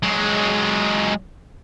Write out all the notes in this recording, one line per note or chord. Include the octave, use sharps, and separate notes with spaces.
F#3 G#3